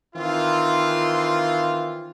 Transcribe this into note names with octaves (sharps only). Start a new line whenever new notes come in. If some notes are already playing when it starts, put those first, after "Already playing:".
D#3 E3 C4 F4